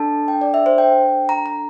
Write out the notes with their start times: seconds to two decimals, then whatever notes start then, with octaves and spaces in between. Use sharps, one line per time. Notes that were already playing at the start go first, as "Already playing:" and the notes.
Already playing: D4 A4 A5
0.28 G5
0.41 D5
0.54 E5
0.66 C5
0.78 G5
1.29 A#5
1.46 A#5